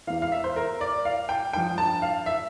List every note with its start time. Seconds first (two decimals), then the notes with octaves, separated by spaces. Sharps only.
0.07 E2 E3 F5
0.22 F5
0.32 E5
0.44 C5
0.56 A#4
0.81 D5
1.05 F5
1.29 G5
1.53 G2 F3 G5
1.78 A5
2.02 F5
2.26 E5